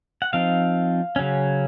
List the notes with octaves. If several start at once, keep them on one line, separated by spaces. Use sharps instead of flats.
F#5
F3 C4 D#4 F5
C#3 F#3 C#4